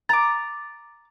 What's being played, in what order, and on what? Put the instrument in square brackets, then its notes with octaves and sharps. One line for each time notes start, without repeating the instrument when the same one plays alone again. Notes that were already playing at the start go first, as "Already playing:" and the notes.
[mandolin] A#5 D6 [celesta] A6